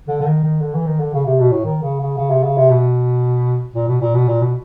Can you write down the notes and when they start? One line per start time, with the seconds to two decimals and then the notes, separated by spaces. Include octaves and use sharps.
0.08 D3
0.20 D3
0.26 D#3
0.43 D#3
0.61 D3
0.75 E3
0.87 D#3
1.00 D3
1.14 C#3
1.26 C3
1.40 B2
1.52 A2
1.65 D#3
1.82 C#3
2.01 C#3
2.17 C#3
2.31 C3
2.44 C#3
2.58 C3
2.71 B2
3.74 A#2
3.88 B2
4.02 A#2
4.15 B2
4.28 A#2
4.42 B2